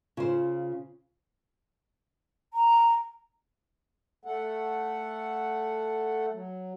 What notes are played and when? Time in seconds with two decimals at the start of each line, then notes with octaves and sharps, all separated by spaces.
0.17 C#3 F4 C5
2.54 A#5
4.25 A3 A4 F#5
6.32 F#3